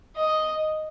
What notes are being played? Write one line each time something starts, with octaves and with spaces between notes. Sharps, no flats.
D#5